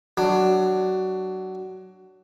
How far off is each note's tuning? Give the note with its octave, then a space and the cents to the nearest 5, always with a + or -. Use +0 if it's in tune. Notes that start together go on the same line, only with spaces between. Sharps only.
F#3 +20 D4 +15